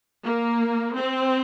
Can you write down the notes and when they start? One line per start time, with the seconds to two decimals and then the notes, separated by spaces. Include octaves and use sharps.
0.24 A#3
0.96 C4